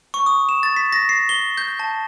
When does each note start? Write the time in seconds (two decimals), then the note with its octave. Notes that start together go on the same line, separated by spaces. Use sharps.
0.14 C#6
0.26 D#6
0.49 E7
0.63 A6
0.76 B6
0.93 A#6
1.09 C7
1.29 G7
1.58 G6
1.80 A5